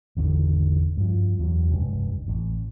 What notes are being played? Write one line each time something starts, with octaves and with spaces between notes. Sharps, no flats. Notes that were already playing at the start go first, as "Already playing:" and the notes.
G#1 E2 D3 D#3
G2 F3
E2 F#3
F1 C#2 G2
A1